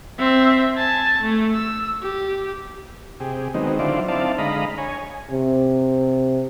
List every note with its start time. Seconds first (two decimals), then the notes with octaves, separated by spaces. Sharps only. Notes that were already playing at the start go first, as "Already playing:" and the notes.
0.19 C4 E5
0.76 G#5 A5
1.21 A3
1.54 E6
2.03 G4
3.20 C3 G4 G#4
3.54 D#3 F#3 G#3 B3 C4 D#4
3.79 D3 F#3 E4 F4 C5 D5
4.08 C4 D#4 E4 D5 F5 A5
4.38 D3 G#3 D#5 F5 A#5 B5
4.78 C#5 G#5
5.31 C3